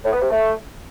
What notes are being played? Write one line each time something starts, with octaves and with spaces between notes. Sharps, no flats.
A2
B3
C3
A3